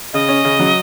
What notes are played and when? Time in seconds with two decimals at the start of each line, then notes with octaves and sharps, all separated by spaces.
0.13 C#3 D#5
0.29 C#4
0.45 C#3
0.59 F#3